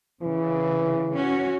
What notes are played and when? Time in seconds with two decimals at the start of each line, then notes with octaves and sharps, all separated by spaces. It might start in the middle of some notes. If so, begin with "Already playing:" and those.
0.22 C#3 E3
1.13 C#4 F#4